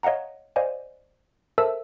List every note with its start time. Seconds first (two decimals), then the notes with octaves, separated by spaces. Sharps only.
0.03 C#5 D#5 F5 F#5 A#5
0.56 C5 D5 D#5 F5 G#5
1.58 A4 A#4 C5 E5 A5 E6